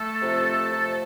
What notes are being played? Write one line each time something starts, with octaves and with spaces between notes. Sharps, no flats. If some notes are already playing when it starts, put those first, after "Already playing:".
Already playing: A3 A4
F2 C3 F3
F2 C3 F3